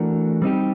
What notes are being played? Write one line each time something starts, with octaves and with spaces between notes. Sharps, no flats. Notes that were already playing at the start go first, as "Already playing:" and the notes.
Already playing: E3 A3 D4 F#4 A#4
G3 C4 D#4 G4